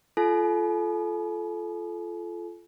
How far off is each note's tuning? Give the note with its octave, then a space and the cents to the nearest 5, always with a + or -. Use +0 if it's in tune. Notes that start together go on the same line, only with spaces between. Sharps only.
F4 -20 A4 -25 G#5 +45